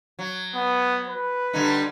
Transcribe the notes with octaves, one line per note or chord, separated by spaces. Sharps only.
F#3
B3
B4
D3 G3 D#4